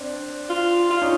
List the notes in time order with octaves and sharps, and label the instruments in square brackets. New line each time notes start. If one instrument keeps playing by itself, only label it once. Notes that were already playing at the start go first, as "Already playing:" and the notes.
Already playing: [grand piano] C4 D4
[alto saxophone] F4
F4
[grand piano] C#4 D#4